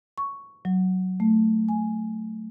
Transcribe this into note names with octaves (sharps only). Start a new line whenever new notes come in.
C#6
F#3
A3
G#5